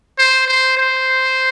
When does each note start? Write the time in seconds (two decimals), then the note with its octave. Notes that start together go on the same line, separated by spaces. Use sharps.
0.18 C5
0.47 C5
0.77 C5